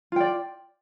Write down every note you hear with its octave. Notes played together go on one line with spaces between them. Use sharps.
F4 D5 G5